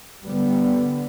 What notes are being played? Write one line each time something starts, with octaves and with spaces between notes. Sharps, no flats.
D3 G3 B3